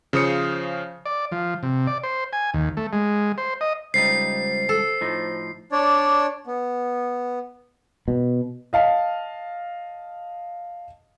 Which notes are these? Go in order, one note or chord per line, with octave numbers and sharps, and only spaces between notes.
C#3 F3 C5 D#6 C#7
D5
F3
C3
D5
C5
G#5
D#2
A3
G#3
C5
D#5
C#2 G3 D#4 C5 C7
A4
A2 F3 D#4
D4 C#5 D5
B3
B2
D#5 F5 A5